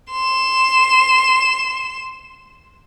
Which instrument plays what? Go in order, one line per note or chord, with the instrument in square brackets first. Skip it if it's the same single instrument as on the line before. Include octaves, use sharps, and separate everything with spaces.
[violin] C6 E7